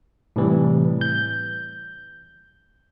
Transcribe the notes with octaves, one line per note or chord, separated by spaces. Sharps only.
A2 C3 E3 G3
G6